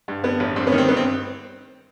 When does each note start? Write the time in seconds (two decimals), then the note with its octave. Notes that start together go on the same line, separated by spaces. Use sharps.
0.08 G2
0.24 G2 B3
0.40 A1
0.56 G2 C4
0.67 B3 C#4
0.72 D#3
0.78 C4
0.88 G2 B3
0.97 C4